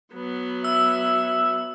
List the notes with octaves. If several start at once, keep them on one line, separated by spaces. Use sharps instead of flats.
F#3 B3
E5 E6